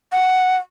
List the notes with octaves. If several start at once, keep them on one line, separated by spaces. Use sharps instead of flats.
F#5